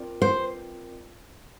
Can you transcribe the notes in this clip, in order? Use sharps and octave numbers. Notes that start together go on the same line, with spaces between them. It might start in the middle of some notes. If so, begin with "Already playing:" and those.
Already playing: C4 F4 A#4 D5 G5
C5